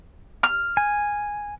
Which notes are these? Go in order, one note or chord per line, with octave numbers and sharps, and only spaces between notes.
F6
G#5